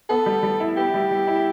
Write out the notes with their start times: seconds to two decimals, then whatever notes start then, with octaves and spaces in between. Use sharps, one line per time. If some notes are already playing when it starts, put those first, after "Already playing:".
0.09 B3 A4
0.26 G3
0.43 G3
0.60 E4
0.77 B3 G4
0.94 G3
1.11 G3
1.27 E4